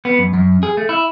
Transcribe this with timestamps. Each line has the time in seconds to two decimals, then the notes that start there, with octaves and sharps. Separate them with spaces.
0.05 B3
0.19 F#2
0.34 F#2
0.63 G#4
0.77 A3
0.89 E4